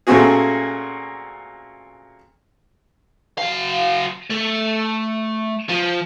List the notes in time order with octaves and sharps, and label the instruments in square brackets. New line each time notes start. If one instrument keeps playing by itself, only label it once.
[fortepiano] A#2 A3 C4 C#4 F#4 G#4
[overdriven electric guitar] F#3 F5
A3
F3